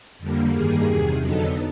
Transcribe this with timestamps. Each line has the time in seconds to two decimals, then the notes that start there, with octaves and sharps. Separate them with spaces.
0.19 F2 D3 G3 A#3
0.52 G2 D#3 G3 A#3 G#4
0.86 E2 C3 D#3
1.20 F2 D3 F#3 B3 D#4 A4